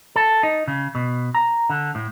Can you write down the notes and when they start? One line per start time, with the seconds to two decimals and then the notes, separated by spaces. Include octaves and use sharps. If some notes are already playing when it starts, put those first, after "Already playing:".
0.16 A4
0.43 D#4
0.68 C#3
0.95 B2
1.35 A#5
1.70 D3
1.95 A2